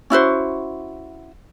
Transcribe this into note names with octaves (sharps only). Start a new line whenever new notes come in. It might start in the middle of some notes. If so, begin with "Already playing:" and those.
C#4 E4 F#4 C5